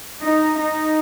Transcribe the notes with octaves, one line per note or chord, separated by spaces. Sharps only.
D#4
D#4